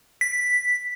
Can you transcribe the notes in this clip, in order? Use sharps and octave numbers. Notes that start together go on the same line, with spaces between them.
B6